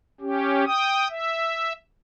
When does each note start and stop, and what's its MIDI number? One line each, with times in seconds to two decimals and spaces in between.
0.21 0.65 61
0.21 0.65 67
0.66 1.08 79
0.66 1.08 87
1.10 1.73 76